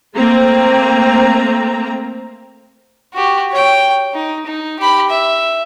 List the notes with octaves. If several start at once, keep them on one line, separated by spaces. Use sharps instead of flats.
A3 A#3 C4 A#5
F#4 G4
C#5 G5
D#4
D#4
G4 B5
E5